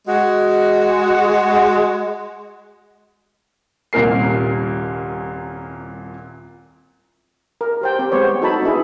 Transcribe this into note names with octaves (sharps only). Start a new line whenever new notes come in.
G#3 F#4
D#1 C2 A#2 A#4 C7
A#4
G4 C5 G5
C4 G4
G#3 B3 C5 C#5
D#4 F#4 A4 C#5 A5 B5
B3 D4 E4 G#4